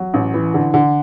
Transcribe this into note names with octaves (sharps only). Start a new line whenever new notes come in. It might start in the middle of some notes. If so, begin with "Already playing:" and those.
Already playing: F#3
A1
E3
D3
D3